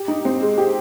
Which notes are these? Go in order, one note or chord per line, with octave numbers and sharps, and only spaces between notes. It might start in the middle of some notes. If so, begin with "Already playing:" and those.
Already playing: G4
D#4
C4
G#3
G4